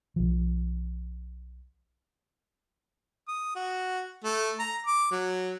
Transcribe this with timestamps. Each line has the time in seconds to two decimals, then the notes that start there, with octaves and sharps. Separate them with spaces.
0.16 B1 F3
3.28 D#6
3.56 F#4
4.24 A3
4.59 A#5
4.86 D6
5.12 F#3